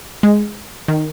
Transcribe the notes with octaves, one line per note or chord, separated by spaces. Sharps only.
G#3
D#3